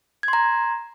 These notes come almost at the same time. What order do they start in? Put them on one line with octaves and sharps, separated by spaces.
G#6 C6 A#5